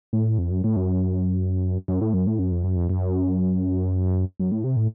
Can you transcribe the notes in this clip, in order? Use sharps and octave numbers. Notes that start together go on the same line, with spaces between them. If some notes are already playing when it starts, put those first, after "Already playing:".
A2
F2
F#2
A2
F#2
F#2
A2
F#2
A2
F#2
F2
F#2
F2
F#2
F#2
A2
C3
A2